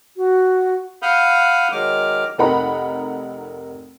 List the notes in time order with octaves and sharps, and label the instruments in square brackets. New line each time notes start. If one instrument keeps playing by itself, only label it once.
[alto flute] F#4
[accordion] F5 F#5 B5 D#6 F6 G6
D#3 F#3 G#3 D6 F6
[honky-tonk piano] F1 D#4 A#4 F#5 B5